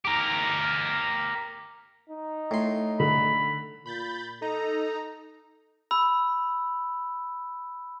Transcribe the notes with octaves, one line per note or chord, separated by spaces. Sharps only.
G4 A#4
D#4
A2 C6
D3 B5
A#2 B5 G6 A6
D#4 A4 A#5
B5 E6